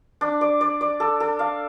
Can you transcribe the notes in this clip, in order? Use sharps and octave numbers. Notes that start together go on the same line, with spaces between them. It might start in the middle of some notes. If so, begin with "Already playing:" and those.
D4
D5
D5
D5
A4
A4
F5